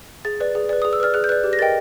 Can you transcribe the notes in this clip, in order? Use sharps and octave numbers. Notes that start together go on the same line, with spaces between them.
G#4 A6
B4 D5
G#4
B4 D5
G#4 D#6
E6
B4 D5 F6
G#4 F#6
G6
B4 D5 F#6
G4
A#6
A#4 D#5 G5 A6